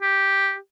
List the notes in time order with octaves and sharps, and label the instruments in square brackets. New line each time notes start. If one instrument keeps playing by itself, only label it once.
[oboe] G4